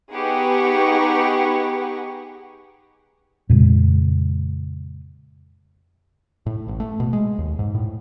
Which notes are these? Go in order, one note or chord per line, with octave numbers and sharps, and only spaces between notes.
B3 D#4 G4 G#4 F#5 C#6
F2 A#2 C#3 G#3
A2
A1
A3
B2
G#3
D#2
G#2
A2